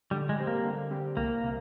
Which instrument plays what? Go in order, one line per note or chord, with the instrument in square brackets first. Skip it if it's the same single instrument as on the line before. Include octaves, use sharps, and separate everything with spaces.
[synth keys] D3 [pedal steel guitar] G3
[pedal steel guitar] G#3
[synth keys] G3 C4 G4
[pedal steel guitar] A#3
[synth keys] D3
G3 C4 G4
[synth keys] C2 [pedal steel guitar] A#3
[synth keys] C3